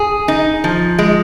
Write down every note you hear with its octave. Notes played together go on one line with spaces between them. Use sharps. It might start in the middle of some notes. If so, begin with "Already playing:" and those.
Already playing: G#4
D#4
F3
G#3